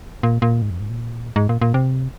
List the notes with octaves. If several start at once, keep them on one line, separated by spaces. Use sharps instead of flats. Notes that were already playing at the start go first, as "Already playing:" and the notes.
A#2
A#2
G#2
F2
G#2
A#2
G#2
A#2
A#2
C3